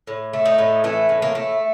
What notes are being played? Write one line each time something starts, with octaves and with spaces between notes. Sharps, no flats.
A2
A3
D#4
A2
E3 A3
A2
A#3
A3